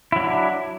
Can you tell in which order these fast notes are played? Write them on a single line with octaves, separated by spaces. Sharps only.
E4 F#3 D4